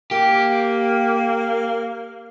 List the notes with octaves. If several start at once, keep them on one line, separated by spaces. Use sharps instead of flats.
A#3 G4